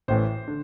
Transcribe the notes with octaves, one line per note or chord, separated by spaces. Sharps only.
A1 A2 E3 C5
D3